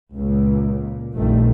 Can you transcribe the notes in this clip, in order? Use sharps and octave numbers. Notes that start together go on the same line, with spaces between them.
C#2 A#2 C#3
A#2
F1 A#1 A#2 D#3 G3 A3